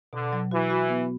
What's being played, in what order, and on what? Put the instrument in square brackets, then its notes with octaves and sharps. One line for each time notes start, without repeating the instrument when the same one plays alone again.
[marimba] B2 [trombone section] D3
[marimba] F#3
[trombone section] E3 [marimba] F#4
[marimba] F#4
B3